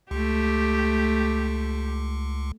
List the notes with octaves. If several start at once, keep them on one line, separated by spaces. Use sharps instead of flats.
C#2 A3 G4